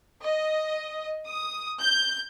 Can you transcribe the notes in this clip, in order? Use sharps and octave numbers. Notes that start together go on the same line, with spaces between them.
D#5
D#6
G6